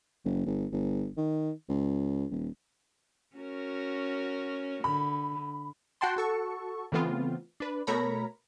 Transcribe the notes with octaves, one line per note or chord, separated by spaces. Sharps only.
F#1
G1
G1
D#3
C#2
D#1
C#4 F#4 A#4
D3 B5
F#4 F#5 G5 A5 C6
F#4 A4 C#6
C#3 E3 A3 B3 C4 F4
D4 B4
B2 A3 A#4 C#5 A#5 B5